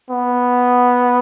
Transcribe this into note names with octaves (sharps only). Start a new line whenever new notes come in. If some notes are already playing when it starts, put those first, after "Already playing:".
B3